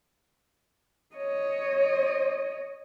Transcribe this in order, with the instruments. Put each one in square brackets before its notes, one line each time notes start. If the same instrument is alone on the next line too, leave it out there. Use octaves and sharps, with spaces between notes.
[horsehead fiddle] C#5 D#5